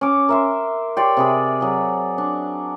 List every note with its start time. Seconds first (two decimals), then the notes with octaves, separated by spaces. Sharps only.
0.01 C#4 D6
0.29 A#4 E5 C6
0.97 G4 C#5 D5 C6
1.17 C3 G#4 B5
1.61 F#3 G#4
2.18 D4